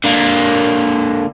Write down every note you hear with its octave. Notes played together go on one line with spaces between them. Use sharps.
D3 A#3